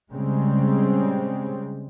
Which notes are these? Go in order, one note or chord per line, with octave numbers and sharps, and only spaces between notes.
C#3 G3 G#3 C4